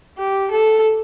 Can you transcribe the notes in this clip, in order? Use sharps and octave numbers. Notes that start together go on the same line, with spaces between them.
G4
A4